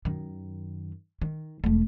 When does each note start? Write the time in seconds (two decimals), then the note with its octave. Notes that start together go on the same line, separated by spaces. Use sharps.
0.05 F#2 D#3
1.22 D#3
1.64 E1 A3